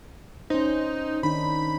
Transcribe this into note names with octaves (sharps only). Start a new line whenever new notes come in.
C#4 D#4 C5
D#3 D4 D#4 B5